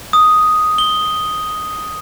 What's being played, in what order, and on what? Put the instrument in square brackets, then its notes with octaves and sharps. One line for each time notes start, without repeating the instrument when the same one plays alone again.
[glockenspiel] D#6
G7